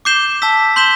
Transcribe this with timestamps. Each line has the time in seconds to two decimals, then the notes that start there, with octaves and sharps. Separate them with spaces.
0.05 D6 G6 C7 E7 G7
0.42 A5 E6 B6
0.76 C6 G6 B6 E7 G7